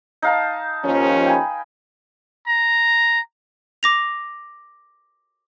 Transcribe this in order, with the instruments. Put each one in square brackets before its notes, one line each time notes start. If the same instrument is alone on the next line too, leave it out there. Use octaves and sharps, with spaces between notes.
[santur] D#4 F5 A5
[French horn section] D#2 F3 C#4
[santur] G5 G#5 B5
[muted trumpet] A#5
[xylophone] D6 A#6 F7